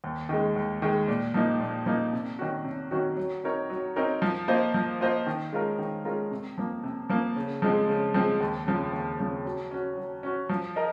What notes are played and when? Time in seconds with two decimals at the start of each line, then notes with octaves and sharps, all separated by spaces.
0.04 D#2
0.29 D#3 G#3
0.56 D#2
0.82 D#3 G#3
1.08 A#2
1.34 F3 A#3 D#4
1.60 A#2
1.86 F3 A#3 D#4
2.13 C3
2.39 D#3 F#3 C#4 F#4
2.64 C3
2.91 D#3 F#3 C#4 F#4
3.17 F#3
3.44 C4 D#4 A#4 C#5
3.70 F#3
3.96 C4 D#4 A#4 C#5
4.22 F3
4.48 A#3 F4 C5 D#5
4.74 F3
5.01 A#3 F4 C5 D#5
5.27 D#3
5.53 G#3 C#4 F4 A#4
5.79 D#3
6.05 G#3 C#4 F4 A#4
6.31 C3
6.58 F3 A#3
6.83 C3
7.09 F3 A#3
7.36 C#3
7.62 F3 G#3 C4
7.88 C#3
8.14 F3 G#3 C4
8.40 D#2
8.67 C#3 F3 C4
8.93 D#2
9.19 C#3 F3 C4
9.45 F#3
9.71 C#4 F#4
9.97 F#3
10.23 C#4 F#4
10.49 F3
10.76 A#4 D#5